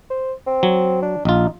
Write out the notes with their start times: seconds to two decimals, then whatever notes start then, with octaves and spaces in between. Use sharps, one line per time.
0.10 C5
0.47 C4
0.63 F#3
1.02 D4
1.25 A#1 D#4 F4